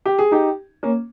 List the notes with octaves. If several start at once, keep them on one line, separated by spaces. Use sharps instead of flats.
G4
G#4
D#4 G4
A#3 C#4